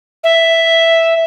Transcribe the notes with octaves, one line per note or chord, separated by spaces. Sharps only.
E5